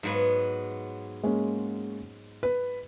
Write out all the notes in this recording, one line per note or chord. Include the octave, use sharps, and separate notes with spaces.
G#2 F#3 B3
G#3 A#3 C#4
B4